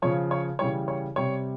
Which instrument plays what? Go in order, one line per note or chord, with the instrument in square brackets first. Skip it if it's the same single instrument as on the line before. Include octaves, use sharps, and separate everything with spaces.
[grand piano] C#3 F3 C#5
C#5
C#3 E3 G3 C#5
C#5
C3 G3 C#5